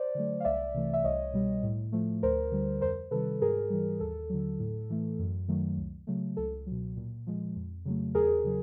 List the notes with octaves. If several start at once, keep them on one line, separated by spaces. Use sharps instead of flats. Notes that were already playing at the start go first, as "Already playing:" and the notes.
Already playing: C5 D5
D3 F#3 A3
F5
C2 D5 E5
C3 E3 A3
E5
C2 C#5 D#5
B2 G3
A2
F3 A3
D2 A#4 C5
D3 G3
F2 A#4 C5
C3 D#3 G3 A4 B4
G#2 G#4 A#4
E3 G3
D#2 A4
D3 F#3
A2
E3 A3
F#2
D#3 F#3 A3
C#2
C#3 F#3 A3
C#2 A4
B2 F#3
A#2
F3 G#3
F2
C#3 F#3 A3
E2 G#4 A#4
C#3 F#3